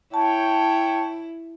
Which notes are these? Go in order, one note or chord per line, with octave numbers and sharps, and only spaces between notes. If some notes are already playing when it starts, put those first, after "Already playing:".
E4 C#5 G5 A5